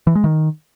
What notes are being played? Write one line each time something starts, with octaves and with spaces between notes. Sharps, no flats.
E3
G#3
D#3